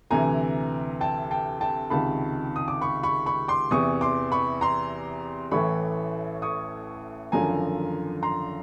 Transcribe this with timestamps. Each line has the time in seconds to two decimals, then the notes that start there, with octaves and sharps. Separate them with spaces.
0.11 D2 C3 E3 G#5 A#5
1.01 G5 A5
1.31 G5 A5
1.61 G5 A5
1.90 C#2 C3 D#3 A5 B5
2.56 D#6
2.68 D6
2.81 B5 C#6
3.03 B5 C#6
3.26 B5 C#6
3.48 C6 D6
3.71 E2 C3 E3 C#6 D#6
4.01 C6 D6
4.32 B5 C#6
4.61 A#5 C6
5.51 A1 A2 E3 B5 C#6
6.42 C#6 D#6
7.32 G#1 F#2 D3 F3 G#5 A#5
8.23 A#5 C6